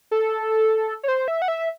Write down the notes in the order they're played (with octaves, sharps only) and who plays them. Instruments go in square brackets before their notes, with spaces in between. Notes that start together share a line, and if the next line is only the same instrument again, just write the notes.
[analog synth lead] A4
C#5
C5
E5
F#5
E5